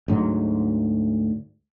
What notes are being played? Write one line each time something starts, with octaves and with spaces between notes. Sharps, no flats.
D2 G#2 F#3